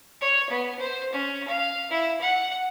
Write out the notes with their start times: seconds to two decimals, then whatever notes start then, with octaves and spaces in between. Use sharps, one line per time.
0.21 C#5
0.50 B3
0.79 C5
1.12 C#4
1.48 F5
1.90 E4
2.21 F#5